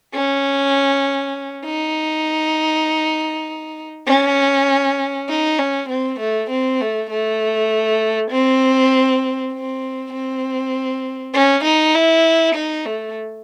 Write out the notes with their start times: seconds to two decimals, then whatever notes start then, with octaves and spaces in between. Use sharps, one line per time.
0.14 C#4
1.65 D#4
4.07 C#4
5.29 D#4
5.59 C#4
5.89 C4
6.20 A3
6.50 C4
6.81 A3
7.10 A3
8.31 C4
9.53 C4
10.13 C4
11.34 C#4
11.64 D#4
11.94 E4
12.55 D#4
12.85 A3